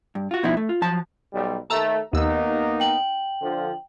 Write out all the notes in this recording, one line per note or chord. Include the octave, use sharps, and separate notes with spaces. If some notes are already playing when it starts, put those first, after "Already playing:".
G2
F4 F#4
B2 F3 B3 D#4 E4
A3
F4
F3 F#3 A5
B1 G3
D#2 A3 A5 A#5 E6
D#2 A#3 B3 D#4 E6
G5 F#7
D3 F3